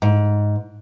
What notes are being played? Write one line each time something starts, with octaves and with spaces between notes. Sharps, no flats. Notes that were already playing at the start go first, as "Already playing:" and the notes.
G#2